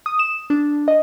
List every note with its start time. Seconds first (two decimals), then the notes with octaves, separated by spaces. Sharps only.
0.06 D#6
0.19 E7
0.50 D4
0.88 D#5